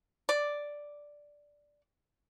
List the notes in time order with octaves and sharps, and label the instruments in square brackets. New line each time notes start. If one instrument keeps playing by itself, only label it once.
[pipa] D5